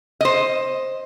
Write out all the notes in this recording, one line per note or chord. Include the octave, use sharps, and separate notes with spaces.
C5 D#5